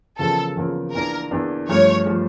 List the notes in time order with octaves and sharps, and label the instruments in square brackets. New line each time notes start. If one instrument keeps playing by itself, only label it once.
[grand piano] E2 C#3 F3 A#3 [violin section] A4
[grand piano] E2 C#3 F3 A#3
[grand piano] E2 E3 A#3 D4 [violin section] A#4
[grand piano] E2 E3 A#3 D4
[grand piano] G2 F3 A3 [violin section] C#5
[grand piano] F3 A3